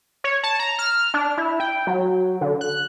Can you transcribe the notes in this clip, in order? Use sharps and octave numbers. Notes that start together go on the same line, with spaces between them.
C#5
A5
A#5
F6
D4
E4
G5
F#3
D3
F#6